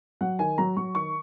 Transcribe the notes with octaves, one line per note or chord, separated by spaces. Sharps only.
F#3 F#5
D#3 G#5
F#3 A#5
F#3 C#6
D#3 C#6